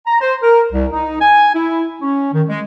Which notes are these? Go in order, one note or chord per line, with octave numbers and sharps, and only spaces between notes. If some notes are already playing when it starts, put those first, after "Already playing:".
A#5
C5
A#4
C2
D#4
G#5
E4
C#4
D#3
G#3